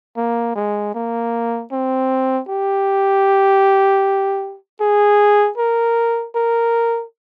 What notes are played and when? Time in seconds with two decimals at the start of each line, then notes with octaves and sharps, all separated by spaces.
0.17 A#3
0.56 G#3
0.95 A#3
1.72 C4
2.49 G4
4.81 G#4
5.58 A#4
6.35 A#4